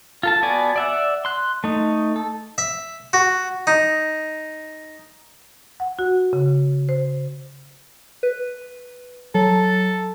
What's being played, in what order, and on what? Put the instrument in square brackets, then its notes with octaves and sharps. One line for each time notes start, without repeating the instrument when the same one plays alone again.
[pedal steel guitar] F4 A4 A5
B3 F#4 D5 G#5 A5
D5 E5 F#5
C6 F#6
A3 D#4
A4
[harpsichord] E5
F#4
D#4
[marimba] F#5
F#4
C#3
C5
[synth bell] B4
[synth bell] F#3 [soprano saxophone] A4